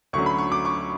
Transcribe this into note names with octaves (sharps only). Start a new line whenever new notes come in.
D2 D3 F#3 C#4 C#6
B5
C#6
D6
C#6